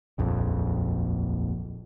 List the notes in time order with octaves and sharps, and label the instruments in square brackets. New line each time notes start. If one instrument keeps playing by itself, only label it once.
[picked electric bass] D#1 A#1 F2